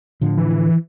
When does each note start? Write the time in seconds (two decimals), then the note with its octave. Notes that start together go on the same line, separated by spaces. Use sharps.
0.21 A2 D3 F3
0.37 E3